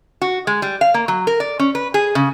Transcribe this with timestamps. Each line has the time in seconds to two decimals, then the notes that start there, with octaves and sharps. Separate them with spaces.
0.22 F#4
0.47 G#3
0.62 G3
0.81 F5
0.94 A#3
1.08 F#3
1.27 A#4
1.40 D5
1.59 C#4
1.75 B4
1.94 G#4
2.15 C#3